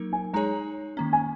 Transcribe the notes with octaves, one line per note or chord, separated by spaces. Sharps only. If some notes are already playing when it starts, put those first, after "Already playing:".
Already playing: F#3 A#3 D#4 A#4
G#5
G#3 D#4 G#4 C#5 A#5
D#3 A#3 C#4 A#5
G#5